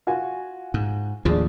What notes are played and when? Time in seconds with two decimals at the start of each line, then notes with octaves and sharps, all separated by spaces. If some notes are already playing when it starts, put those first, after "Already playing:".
0.07 F4 F#4 G#5
0.74 G#2
1.25 D#2 A2 F3 D4 G#4